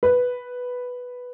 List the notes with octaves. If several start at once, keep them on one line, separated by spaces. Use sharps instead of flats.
B4